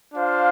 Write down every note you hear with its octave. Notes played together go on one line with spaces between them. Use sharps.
D4 F4 C5 F5